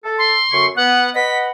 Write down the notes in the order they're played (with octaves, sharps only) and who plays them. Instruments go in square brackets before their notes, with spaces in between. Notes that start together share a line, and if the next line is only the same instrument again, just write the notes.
[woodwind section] A4
[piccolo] C6
[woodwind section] F#2 D3 C#6
[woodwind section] B3 [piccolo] F#5
[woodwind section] B4 D#5 F#5 [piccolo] B6